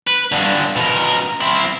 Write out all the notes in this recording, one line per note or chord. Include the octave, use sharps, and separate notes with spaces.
B4
G2 D3
B2 A#4
C4 E4